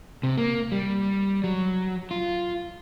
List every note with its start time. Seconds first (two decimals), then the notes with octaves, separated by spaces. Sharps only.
0.23 C3
0.38 A#3
0.72 G3
1.44 F#3
2.11 F4